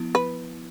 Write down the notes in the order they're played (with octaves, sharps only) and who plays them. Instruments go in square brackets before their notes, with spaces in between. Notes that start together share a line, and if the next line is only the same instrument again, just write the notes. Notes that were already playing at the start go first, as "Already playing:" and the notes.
Already playing: [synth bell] F3 B3 E4
[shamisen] B4